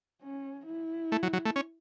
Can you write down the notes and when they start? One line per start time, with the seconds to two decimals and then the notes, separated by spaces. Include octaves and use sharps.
0.22 C#4
0.66 E4
1.12 A3
1.23 F#3
1.33 F#3
1.45 A3
1.56 C#4